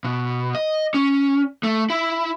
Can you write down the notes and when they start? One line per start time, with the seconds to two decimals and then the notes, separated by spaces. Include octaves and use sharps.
0.04 B2
0.55 D#5
0.94 C#4
1.63 A3
1.90 E4